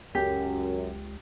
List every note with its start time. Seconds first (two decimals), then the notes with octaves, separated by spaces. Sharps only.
0.15 C#2 F#2 G4